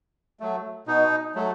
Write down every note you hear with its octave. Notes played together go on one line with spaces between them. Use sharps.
F#3 A3
B2 D#4
F#3 A3